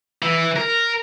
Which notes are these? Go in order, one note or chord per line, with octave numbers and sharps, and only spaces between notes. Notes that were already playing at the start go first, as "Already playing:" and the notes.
E3
A#4